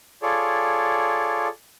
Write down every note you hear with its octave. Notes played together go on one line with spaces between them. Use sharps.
F4 G#4 A4 C#5 D5